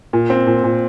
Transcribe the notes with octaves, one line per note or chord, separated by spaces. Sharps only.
A#2
C4
A#2
A#2